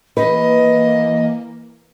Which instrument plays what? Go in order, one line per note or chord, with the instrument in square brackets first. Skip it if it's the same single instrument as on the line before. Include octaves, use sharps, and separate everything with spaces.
[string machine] E3 A#3 [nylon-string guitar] B4 [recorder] D#5